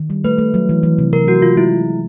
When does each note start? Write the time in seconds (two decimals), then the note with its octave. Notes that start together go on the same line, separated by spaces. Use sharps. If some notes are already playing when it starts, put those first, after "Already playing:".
Already playing: D#3
0.10 G3
0.24 A3 B4
0.38 A3
0.54 F#3
0.69 E3
0.83 E3
0.98 C3
1.13 C3 A#4
1.28 F#3 F#4
1.42 C3 F4
1.57 G#3 E4